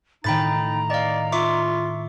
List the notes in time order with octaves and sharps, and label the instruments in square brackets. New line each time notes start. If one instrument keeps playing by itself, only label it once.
[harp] A2 D#3 [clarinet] D#4 [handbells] G5 B5 A6 [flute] A#5
[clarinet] D5 [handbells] D#5 F5
[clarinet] F4 [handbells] E5 C#6 D6